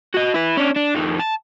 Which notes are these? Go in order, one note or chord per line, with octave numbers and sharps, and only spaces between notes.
F#4 D#5
E4 B4
C#4 D4
D4
F2 D#3
A5